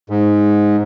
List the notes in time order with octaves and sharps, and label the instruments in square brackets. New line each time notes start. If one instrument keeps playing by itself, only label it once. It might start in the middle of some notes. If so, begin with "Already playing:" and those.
[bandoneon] G#2